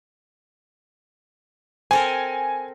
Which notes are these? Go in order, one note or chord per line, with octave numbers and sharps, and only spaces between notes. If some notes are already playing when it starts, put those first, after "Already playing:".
C4 A4 A#4 G#5